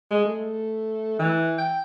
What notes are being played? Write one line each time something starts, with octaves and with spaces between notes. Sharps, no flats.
G#3
A3
E3
G5